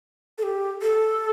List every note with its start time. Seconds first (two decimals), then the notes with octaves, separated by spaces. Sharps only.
0.38 A4
0.43 G4
0.82 A4